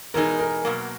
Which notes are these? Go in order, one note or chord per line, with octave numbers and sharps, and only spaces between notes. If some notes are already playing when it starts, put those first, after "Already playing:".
E2 B2 G#3 D#4 G#4 A#4
A#4
B2 F#3 A#3